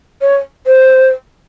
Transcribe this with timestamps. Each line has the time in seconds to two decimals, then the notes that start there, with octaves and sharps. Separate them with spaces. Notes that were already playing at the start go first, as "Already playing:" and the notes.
0.21 C#5
0.67 C5